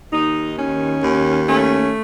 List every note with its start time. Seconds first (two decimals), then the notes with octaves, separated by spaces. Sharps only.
0.12 D#2 D#4
0.58 D#3 C#4
1.03 D#2
1.49 A3 C#4